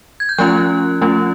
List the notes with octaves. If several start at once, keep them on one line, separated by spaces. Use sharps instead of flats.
G#6
G6
F3 A3 C#4 F4 F#6
F3 A3 C#4 F4